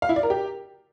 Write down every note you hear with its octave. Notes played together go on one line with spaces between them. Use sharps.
F5
E4
D5
A#4
G4